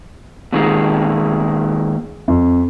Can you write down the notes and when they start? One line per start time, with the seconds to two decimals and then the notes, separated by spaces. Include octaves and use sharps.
0.53 A#2 D#3 G#3
2.28 F2